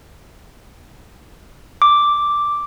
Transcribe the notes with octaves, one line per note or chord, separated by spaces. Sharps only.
D6